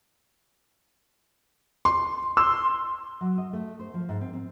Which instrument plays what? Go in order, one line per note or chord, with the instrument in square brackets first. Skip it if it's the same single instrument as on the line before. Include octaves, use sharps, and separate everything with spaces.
[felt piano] C6
[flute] C6 [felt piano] E6
[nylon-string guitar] F#3
D#5
A3
C5
F3
G#2
C4
C4